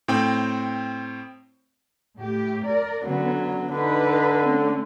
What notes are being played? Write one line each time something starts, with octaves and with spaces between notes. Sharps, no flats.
A2 C4 G5
A2 G4
A#4 D5
D3 F#3 B3 C#4
D3 D#4 B4
A3 C4 C#4